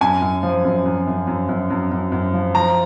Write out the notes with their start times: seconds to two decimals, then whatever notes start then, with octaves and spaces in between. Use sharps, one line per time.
0.01 F#2 G#5
0.22 F#2
0.43 F3
0.65 F#2
0.86 F#2
1.07 F#2
1.27 F#2
1.49 F#2
1.70 F#2
1.91 F#2
2.12 F#2
2.34 F3
2.55 F3 A#5